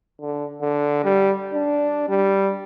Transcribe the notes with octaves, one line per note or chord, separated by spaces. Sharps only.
D3
D3
G3
D4
G3